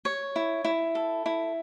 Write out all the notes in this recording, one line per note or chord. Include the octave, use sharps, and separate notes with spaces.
C#5
E4
E4
A4
E4